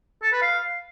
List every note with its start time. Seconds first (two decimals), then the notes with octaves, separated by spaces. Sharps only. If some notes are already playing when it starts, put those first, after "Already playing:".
0.22 A4
0.32 B4
0.42 F5